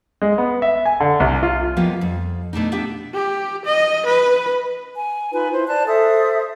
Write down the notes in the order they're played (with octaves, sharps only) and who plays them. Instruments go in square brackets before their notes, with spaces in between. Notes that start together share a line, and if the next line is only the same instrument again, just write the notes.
[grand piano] G#3
B3
E5
G#5
D3
C2
F4
[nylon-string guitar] F3 G3 A#3 B3 F4 D#5
F2
B2 A3 D4 D#4
B3 D4 E4 G4 E5
[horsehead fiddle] G4
D#5
B4
[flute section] G#5
D#4 F4 B4 G#5
E4 C5
C5 D5 A5 F#6
A4 C5 E5 D#6